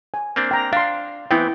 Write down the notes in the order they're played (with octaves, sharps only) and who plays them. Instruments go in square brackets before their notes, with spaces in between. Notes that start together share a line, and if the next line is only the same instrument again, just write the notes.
[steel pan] G#5
[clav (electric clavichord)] A#3 C4 D4
[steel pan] G5 A#5
[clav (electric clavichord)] D4 [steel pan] F5 C6
[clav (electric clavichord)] E3 B3 C4 [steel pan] E4 G5